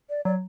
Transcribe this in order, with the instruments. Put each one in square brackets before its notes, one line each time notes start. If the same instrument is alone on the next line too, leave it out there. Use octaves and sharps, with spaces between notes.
[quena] D5
[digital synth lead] F#3 [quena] D5